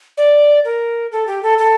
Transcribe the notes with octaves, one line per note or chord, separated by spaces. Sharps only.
D5
A#4
A4
G4
A4
A4